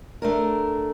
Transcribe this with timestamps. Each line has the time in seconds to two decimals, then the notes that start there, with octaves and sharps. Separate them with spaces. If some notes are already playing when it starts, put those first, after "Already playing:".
0.22 A3 D4 A#4